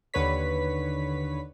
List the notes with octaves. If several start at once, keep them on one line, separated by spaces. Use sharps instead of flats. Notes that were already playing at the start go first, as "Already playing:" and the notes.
D#2 D3 B4 C#5 B6